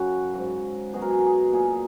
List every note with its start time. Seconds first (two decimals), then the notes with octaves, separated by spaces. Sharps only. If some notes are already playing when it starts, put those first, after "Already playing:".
Already playing: F#2 C#3 F#3 F#4
0.34 G#2 F#3
0.93 B2 F#3 G#4
1.02 A#4
1.10 G#4
1.19 A#4
1.26 G#4
1.53 A#2 F#3 G#4